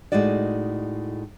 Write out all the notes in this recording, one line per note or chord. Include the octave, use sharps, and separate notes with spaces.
A2 G#3 D#4 F#4 D5